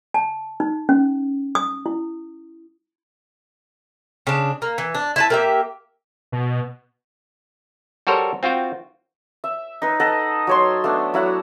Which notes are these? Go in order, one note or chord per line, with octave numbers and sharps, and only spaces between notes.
A5
D#4
C#4
D#6
E4
C#3 D4
A#3
E3
D4
E4 B4 A5
A#3 G4 E5
B2
G3 F#4 A4 A#4 C5 C#5
C4 F4 F#4 G5
E5
D#4 B4
A4 D#5 F#5
F#3 C#5 C6
A3 B3 D4
F#3 E4 F#5